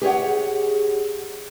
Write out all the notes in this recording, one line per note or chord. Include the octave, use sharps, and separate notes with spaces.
G4 G#4 C#5 F#5